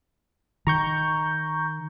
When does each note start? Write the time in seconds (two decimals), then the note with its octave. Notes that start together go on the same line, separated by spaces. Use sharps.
0.67 D#3 A#5 C#6 G6